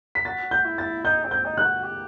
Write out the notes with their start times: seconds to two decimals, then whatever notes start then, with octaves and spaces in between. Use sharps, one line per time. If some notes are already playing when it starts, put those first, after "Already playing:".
0.15 B6
0.25 F#4 A6
0.51 G6
0.64 E4
0.78 A6
1.04 D#4 G6
1.24 C4
1.31 G6
1.45 D#4
1.57 F#6
1.64 F#4
1.84 G4